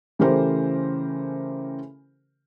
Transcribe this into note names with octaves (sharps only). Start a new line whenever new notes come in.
C#3 E3 A3 G4 A#4 C5